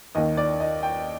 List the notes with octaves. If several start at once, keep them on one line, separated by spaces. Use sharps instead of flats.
D#2 D#3 D#5
D5
D#5
G5